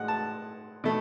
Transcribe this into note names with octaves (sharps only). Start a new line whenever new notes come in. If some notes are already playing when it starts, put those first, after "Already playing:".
Already playing: A2 G#3 F#5
A5
B2 A3